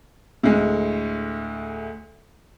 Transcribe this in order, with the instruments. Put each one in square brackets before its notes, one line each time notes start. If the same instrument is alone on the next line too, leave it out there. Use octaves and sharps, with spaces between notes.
[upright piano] D2 A2 G#3